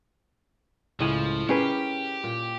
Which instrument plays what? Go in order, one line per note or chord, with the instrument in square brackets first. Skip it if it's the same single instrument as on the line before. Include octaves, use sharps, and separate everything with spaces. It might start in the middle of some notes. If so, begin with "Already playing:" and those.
[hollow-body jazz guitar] C#2 G#5 [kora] A2 [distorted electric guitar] F3
[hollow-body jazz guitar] C#4 G#4 B4 [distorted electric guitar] G4 [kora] A#4
[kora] A#2